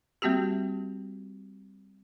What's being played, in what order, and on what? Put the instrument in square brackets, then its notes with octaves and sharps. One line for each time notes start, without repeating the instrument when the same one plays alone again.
[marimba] G3 A#3 C4 F#4 G4